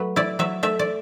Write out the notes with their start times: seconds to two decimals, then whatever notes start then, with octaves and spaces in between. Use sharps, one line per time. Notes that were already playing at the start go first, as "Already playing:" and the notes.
Already playing: F#3 A3 B4
0.16 E4 D5
0.39 F#3 E5
0.63 A3 E5
0.79 D5